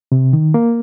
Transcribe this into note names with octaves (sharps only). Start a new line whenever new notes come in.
C3
D#3
A#3